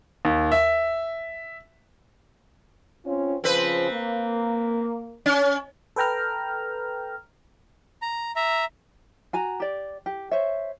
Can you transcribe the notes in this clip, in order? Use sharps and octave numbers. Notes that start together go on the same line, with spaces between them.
D#2
E5
C4 C#4 F4
C#3 F3 C4 B4 C5
A#3
C#4
A4 B4 G5 A#5 F6
A#5
E5 A#5
F#4 G#5 A#5
G4 D5
G4
C5 C#5 E5